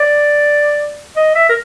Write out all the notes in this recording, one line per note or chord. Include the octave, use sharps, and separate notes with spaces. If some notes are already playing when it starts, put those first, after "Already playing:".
Already playing: D5
D#5
E5
A#4